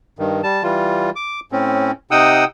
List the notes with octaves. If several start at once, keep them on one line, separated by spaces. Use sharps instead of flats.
G2 D#3
G3 A5
E3 G3 F4
D6
A2 C4 C#4
C3 D#4 F#5 G5 D#6 E6